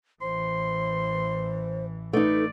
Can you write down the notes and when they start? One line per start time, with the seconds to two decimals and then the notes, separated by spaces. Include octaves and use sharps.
0.22 A1 E3 C5 C6
2.13 A3 D#4 B4 D5